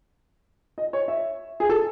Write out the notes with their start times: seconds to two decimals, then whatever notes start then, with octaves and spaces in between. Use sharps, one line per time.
0.78 D#5
0.93 C#5
1.08 E5
1.60 G#4
1.69 A4